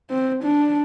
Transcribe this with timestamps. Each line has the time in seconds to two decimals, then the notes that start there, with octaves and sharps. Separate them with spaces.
0.10 C4
0.44 D4